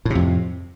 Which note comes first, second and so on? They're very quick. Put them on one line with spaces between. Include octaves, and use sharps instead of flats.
A2 C3 F2